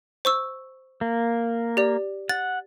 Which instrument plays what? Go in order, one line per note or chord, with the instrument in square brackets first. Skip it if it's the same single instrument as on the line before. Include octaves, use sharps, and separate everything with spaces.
[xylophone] C5 C#6 E6
[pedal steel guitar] A#3
[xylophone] G4 D5
[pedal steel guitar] F#5 [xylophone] A6